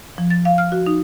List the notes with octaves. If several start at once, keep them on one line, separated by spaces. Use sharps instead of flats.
F3
A6
F5
F6
F#4
D#4